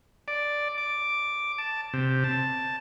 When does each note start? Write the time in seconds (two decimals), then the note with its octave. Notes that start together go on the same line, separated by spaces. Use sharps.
0.28 D5
0.78 D6
1.58 A5
1.93 C3
2.24 A5